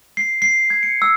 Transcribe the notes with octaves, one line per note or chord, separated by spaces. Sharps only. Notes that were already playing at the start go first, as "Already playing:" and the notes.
C7
C7
G#6
C#7
E6